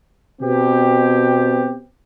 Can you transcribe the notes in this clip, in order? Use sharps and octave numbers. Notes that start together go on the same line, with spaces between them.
B2 C4 G4